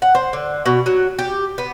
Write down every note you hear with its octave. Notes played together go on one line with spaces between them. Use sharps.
F#5
C5
D3
B2
F#3
G4
B3